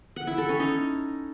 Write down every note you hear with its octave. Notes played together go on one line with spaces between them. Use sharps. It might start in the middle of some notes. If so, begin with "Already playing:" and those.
F#5
E4
A4
C#4
D#4